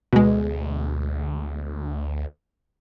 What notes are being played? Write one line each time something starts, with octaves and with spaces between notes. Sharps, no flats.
D2 B2 G#3